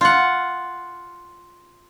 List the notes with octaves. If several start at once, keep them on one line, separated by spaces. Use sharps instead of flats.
F4 F#5